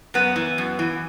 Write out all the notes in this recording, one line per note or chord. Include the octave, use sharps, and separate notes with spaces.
F#2 B3
E3
F#2
E3